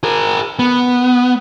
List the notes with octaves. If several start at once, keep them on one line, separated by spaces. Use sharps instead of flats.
G#4 A#4
B3